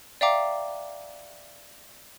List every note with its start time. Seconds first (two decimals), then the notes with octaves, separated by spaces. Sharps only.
0.21 D5 E5 F5 G5 A#5 D6